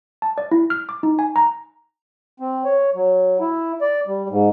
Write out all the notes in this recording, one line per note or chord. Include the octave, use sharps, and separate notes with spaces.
A5
D5
E4
F6
D6
D#4
G#5
A#5
C4
C#5
F#3
E4
D5
G3
G#2